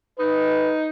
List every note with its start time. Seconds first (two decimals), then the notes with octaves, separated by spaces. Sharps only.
0.19 D#4 B4